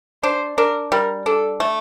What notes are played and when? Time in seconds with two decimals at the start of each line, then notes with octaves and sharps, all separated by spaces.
0.23 D4 C5
0.58 D4 A#4
0.92 G3 A#4
1.26 D4 A4
1.60 A3